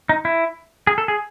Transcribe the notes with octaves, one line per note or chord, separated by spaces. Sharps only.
D#4
E4
G#4
A4
G#4